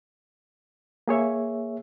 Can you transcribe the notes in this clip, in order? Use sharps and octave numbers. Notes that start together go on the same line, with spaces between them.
A#3 G#4 C#5 E5